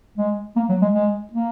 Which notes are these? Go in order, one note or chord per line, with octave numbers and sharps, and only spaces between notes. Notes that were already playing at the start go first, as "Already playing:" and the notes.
G#3
A#3
F#3
G#3
G#3
A#3